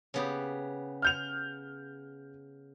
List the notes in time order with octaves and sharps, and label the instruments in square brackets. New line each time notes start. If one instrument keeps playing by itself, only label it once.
[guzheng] C#3 B3 G4
[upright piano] F6 G6 F7